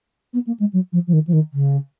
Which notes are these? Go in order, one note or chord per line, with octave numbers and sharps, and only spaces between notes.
B3
A#3
G#3
F#3
F3
F3
D#3
F3
D#3
C#3